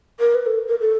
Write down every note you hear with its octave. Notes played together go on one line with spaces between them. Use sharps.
A#4
B4
A4
A#4
A4